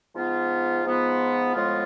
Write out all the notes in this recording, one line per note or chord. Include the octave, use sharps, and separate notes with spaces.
G#2 F3 B3 F4
G#2 F3 B3 F4
A2 F3 G#3 B3 F4